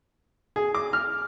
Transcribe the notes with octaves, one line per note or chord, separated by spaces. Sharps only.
G#4
D6
F6